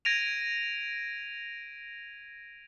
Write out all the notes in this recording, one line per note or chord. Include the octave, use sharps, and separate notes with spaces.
G#6 A#6 D7 D#7 F7